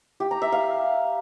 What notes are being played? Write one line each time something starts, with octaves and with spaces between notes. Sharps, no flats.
G4
A#5
E5
F5